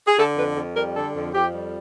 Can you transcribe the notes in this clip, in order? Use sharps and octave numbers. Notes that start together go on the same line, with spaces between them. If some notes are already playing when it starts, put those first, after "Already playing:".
G#4
D3 A4
F2 B4
F2
G3 A#4
D3 A4
F2
F2 G4
G3